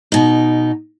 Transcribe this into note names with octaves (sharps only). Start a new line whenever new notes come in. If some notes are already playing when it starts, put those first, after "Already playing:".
B2 D#4